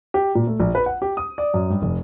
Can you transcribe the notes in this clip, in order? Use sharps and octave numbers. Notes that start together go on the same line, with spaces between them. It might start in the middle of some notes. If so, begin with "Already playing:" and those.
G4
A#2
A3
A#1
B4
F#5
G4
D#6
D5
F#2
G2
F1